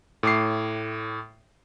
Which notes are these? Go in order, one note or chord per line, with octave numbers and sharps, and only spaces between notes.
A2 D6 C7